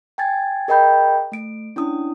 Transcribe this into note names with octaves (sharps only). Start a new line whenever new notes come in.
G5 G#5 G#6 A6
G#4 A#4 D#5 G5 B5 G6
A3 D7
C#4 D4 E4 D#6